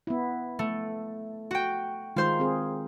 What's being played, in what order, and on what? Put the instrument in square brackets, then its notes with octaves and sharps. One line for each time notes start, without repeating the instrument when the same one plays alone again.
[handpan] B3 E4
[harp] A3
F#4 G5
[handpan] D#3 G#3 D#4 [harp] F4 C5 C6
[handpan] C4 G#4